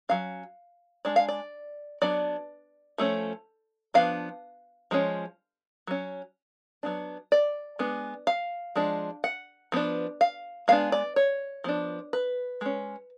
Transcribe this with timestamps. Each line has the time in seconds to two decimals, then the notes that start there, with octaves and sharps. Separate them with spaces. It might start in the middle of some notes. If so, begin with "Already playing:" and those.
0.09 F#3 C#4 F5
1.05 G#3 D4 D5
1.16 F5
1.28 D5
2.02 F#3 B3 D4 D5
2.98 F3 A3 C#4
3.94 F3 B3 D4 F5
4.91 F3 G#3 C#4
5.87 F#3 C#4
6.83 F#3 B3 D4
7.32 D5
7.79 G#3 B3 D4
8.27 F5
8.75 F3 G#3 D4
9.24 F#5
9.72 F3 B3 D4
10.21 F5
10.68 G#3 B3 D4 F5
10.92 D5
11.16 C#5
11.64 F3 B3 D4
12.13 B4
12.61 G#3 C#4